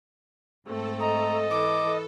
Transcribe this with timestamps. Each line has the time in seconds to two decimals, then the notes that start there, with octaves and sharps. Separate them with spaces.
0.65 G#2 A3 C4 A4
1.00 A4 D#5 A#5
1.50 E3 D6